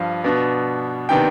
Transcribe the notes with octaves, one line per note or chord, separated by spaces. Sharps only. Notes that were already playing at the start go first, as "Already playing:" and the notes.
Already playing: G2 F3 F5
B2 B3 D4
C3 D#3 B3 D4 G5